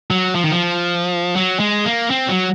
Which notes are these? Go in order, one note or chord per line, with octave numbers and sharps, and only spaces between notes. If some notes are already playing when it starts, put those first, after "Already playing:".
F#3
F3
D#3
F3
F#3
G#3
A#3
C4
F#3